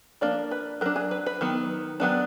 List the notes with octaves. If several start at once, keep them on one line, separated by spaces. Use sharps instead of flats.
F3 A#3 D4 D5
B4
F#3 D4 A#4
G#4
B4
B4
D#3 F#3 B3
D#3 F#3 B3 D4